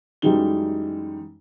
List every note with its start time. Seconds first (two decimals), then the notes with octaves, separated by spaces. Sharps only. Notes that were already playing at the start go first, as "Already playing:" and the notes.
0.22 F#2 E3 G3 G#3 D#4 G7